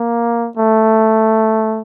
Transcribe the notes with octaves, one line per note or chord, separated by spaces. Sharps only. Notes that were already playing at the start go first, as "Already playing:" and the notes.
Already playing: A#3
A3